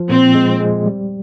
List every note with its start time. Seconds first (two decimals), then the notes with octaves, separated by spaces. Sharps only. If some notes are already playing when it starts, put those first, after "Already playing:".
Already playing: F3
0.10 A#2 C4
0.35 G#3
0.60 G#3
0.86 G3